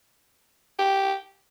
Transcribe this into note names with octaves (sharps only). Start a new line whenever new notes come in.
G4